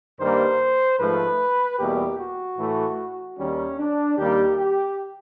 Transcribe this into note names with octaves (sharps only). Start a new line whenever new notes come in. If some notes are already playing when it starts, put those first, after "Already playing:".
G2 D#3 G3 A#3 C5
G#2 F3 A3 B4
E2 B2 G3 A#3 G4
F#4
A2 E3 A3
D#2 D#3 G3 C#4
D4
D#2 D#3 G3 A#3 G4
G4